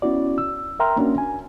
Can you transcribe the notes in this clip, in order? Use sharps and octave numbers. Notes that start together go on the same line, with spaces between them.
B3 C#4 E4 F#4 D5
E6
A#4 E5 G5 A#5 C6 F6
A#3 C#4 D4 F#4 A#4
G#5